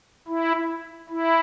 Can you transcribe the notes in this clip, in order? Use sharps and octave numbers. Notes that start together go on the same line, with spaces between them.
E4
E4